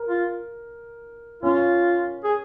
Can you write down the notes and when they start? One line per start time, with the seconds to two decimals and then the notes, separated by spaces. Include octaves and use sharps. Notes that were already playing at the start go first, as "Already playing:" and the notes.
Already playing: A#4
0.08 F4
1.43 C#4 F4
2.24 G#4